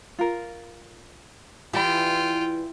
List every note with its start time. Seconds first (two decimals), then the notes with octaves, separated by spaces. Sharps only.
0.19 F4 A#4
1.73 E3 F4 G4 D5 G5 B5